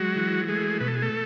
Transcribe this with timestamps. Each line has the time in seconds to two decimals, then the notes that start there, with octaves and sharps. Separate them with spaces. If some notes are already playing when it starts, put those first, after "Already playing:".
Already playing: F#3 G#3 F#4
0.16 E3
0.48 G#3 A3 G#4
0.80 B2 B4
0.88 A4
0.95 G#4
1.02 A3 A4